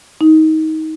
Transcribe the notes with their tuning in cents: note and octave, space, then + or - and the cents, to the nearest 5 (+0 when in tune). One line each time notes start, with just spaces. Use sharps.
D#4 +20